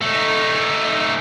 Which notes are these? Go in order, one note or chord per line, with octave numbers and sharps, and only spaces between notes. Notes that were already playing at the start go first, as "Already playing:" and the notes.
A3 D#4